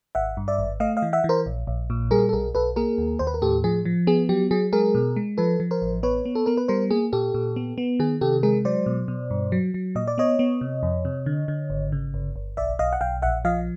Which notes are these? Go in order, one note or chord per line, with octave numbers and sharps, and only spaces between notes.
G#1 E5 F#5
G2
D5 E5
G#1
A3 D#5 F5
D#5 F5
E3
E5 F#5
E3
A#4 C5
A#1
A#1
A#2
G3 G#4 A#4
A4
B1 G#4 A#4
B1 A4 B4
A#3 G#4 A#4
D#2
D#2 C5
B4
A#4
A2 G4 A4
F3 G#4
F3
B3 G#4
F#3 G4
F#3 G#4
G#3 G#4 A#4
B2
G#3
F3 A4 B4
F3
A#4 C5
A1
B3 B4 C#5
B3
A4
B3 A#4
B4
G3 A#4 C5
A#3 G#4
A#2 G4 A4
A#2
B3
B3
D#3 G#4
C3 G4 A4
G#3 G#4 A#4
F#3 C5 D5
B2
B2
G2
F#3
F#3
A#2 D#5
D5
B3 C#5 D#5
B3
C3
F2
C3
D3
D3
G#1
C#3
G1
G1
B1 D5 E5
B1 D#5 F5
F#5
B1 F5 G5
A#1 E5 F#5
F3 D#5 F5